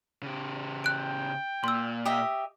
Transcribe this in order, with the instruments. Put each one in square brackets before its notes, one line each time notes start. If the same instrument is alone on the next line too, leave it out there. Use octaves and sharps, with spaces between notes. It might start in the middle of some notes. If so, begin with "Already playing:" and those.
[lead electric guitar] C#3 G4
[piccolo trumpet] G5 [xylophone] F#6 D7
[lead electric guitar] A#2 [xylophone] C6 E6
[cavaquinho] G4 D#5 E5